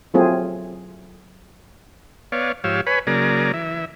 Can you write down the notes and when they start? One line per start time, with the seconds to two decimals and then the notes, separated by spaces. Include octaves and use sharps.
0.14 F#3 A3 C4 F4 G#4
2.32 B3 C#5 D5 F5
2.64 G#2 F3 G4 C#5 F5 E6
2.87 B4 C#5 G#5 B5
3.07 C#3 F#3 A#3 G#4 D5 A#5
3.54 E3 E5